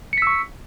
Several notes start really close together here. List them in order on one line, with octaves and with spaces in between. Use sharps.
C#7 B6 E6 C#6